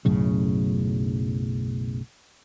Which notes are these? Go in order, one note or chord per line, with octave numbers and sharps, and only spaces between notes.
B1 F#2 A2 C#3